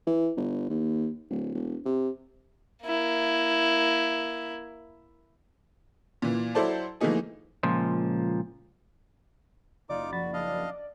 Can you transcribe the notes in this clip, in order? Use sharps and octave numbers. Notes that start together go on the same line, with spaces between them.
E3
G1
D#2
D1
E1
C3
A#3 E4
A#2 E3
F#3 E4 A4 C5 D5 A5
E3 F3 A3 A#3 D#4 G#4
C#2 A#2 F3
F#1 D#4 F4 D5 D6
F3 F#4 B5 A6
D4 D#5 F5